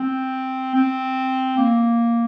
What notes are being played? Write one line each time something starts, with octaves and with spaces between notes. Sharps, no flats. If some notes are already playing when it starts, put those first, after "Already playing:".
Already playing: C4
C4
A#3